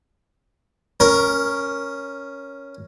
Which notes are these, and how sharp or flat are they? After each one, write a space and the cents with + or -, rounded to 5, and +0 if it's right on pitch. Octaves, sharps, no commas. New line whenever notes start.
C#4 +0 A#4 +5